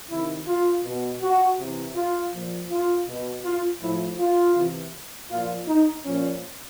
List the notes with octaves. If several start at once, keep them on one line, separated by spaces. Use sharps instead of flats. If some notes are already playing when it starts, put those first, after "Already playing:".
C3 D#3 E4
F4
B2
F#4
C3 E3
F4
A#2 F3
F4
B2
F4
A2 F3 E4
F4
C3 E3
A#2 F3 F4
D#4
A#2 F3 C#4